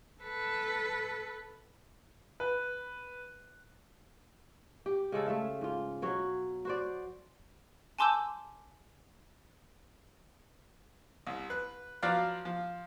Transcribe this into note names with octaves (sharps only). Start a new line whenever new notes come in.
A4 B4
B4
G4
C#3 G#3 A4
A3 A4 E5 F5
G#2 F4
B2 F#3 C#5
F#4 C5 D5
G#5 A5 C6 D6 E6 G6
C2
B4
F3 F#3 B4 D5 F5
F3